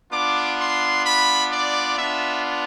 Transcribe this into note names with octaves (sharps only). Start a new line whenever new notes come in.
B3 D4 F4 D6
C6
B5
D5
B3 D4 F4 E5